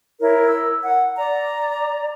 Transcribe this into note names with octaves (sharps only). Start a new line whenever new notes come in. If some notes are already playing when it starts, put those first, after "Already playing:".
E4 A#4 C#5
E6
F#5
D5 A#5